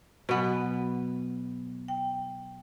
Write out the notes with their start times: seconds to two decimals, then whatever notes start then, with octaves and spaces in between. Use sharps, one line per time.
0.29 B2 F#3 B3 G#5
1.88 G5